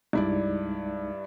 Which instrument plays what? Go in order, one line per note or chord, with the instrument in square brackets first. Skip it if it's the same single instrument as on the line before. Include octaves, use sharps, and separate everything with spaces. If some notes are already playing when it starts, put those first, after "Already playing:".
[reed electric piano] C2 G#3 D#4 [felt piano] G2 E4 D5